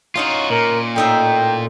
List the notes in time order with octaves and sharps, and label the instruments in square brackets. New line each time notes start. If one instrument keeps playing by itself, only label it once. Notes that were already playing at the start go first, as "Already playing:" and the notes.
[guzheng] C#4 D#4 C#5 [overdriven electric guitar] F4 F#4
[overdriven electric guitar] A#2 [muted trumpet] A#4
[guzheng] A2 D#4 E5 [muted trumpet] G5